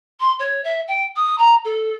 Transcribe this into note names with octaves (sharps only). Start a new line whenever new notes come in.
C6
C#5
E5
G5
D#6
A#5
A4